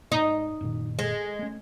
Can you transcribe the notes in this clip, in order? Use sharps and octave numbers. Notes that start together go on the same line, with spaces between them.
G#2 D#4
F#2 A#2 D#3
G#3
A3 C#4